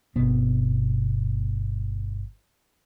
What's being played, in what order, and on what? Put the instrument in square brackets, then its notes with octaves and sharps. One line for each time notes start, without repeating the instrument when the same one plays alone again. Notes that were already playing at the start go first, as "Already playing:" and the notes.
[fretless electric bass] G1 B2 B3 C4